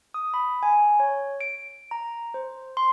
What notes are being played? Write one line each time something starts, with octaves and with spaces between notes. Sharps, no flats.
D#6
B5
G#5
C#5
D7
A#5
C5
C6